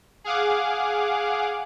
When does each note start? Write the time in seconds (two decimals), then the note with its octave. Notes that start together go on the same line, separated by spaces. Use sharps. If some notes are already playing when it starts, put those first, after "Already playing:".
0.24 G#4 F5 F#5 D6